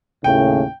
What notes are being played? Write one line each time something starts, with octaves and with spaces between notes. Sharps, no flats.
D#2 A2 C#3 G5